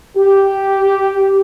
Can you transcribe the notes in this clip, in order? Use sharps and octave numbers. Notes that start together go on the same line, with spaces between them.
G4